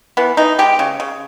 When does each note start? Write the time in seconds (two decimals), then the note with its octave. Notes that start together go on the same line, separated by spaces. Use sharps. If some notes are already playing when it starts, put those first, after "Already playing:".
0.17 E3 B3
0.37 E3 D#4
0.59 G#3 G4
0.79 C#3
1.00 C#3